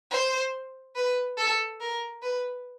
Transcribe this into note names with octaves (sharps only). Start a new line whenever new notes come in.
C5
B4
A4
A#4
B4